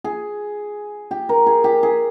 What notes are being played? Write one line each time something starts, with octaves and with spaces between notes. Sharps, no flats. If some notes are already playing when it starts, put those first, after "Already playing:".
G#4
G4
A#4
G#4
G4
G#4